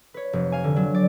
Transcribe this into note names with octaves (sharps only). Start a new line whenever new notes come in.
B4 C#5
F1
F5 G#5
D3
F#3
D5